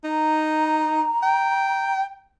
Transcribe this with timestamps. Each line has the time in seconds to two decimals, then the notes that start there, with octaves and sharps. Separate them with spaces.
0.04 D#4 A#5
1.23 G5